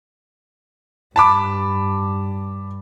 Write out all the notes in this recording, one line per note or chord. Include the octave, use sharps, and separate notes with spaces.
G2 A5 B5 D6